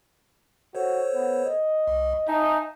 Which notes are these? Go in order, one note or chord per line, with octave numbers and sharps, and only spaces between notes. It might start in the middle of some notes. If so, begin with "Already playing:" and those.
F#4 A4 C5 C#5
B3
D#5
C2
D#4 E5 G#5 A5